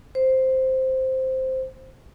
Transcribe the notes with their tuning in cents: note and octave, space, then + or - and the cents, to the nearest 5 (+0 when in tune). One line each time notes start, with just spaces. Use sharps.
C5 +0